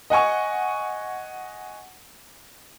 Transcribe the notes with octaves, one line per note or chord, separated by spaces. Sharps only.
D#5 F#5 G#5 C#6